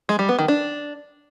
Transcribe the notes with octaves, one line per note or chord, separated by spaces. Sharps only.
G#3
G3
B3
D#3
D4